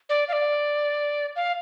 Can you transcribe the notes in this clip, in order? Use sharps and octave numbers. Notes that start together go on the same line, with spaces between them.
D5
F5
D5
F5